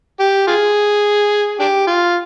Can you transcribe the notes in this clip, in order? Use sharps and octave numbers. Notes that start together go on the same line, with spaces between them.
G4
F4 G#4
D4 G4
F4